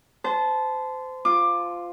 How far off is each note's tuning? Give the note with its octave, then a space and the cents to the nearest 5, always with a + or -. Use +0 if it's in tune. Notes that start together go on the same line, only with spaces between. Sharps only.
C5 -25 A5 -15
F4 +0 D6 +15